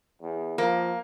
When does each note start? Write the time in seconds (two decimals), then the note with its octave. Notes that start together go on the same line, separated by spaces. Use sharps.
0.22 E2
0.58 F3 A#3